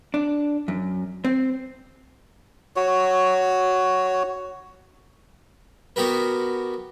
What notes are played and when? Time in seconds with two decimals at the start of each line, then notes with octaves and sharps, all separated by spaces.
0.14 D4
0.68 F#2
1.25 C4
2.76 F#4 C#5
5.96 B3 F#4 G4 A#4 B4